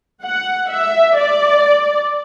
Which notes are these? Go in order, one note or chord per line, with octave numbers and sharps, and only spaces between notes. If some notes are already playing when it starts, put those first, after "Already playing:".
F#5
E5
D5